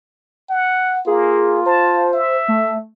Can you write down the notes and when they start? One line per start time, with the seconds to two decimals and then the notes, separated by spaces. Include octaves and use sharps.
0.50 F#5
1.07 A#3 F4 G#4
1.66 C5 A5
2.13 E5
2.48 A3